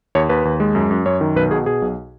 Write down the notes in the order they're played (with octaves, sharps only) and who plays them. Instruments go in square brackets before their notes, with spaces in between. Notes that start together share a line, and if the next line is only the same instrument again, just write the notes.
[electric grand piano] D#2 C#5
D#2 B4
D#2
G#3
F#2
F#2
F#2 C#5
D#3
B1 B4
B2 G#4
B2 G#4
B1